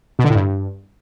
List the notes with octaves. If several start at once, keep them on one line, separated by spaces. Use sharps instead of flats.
B2
D3
A2
G2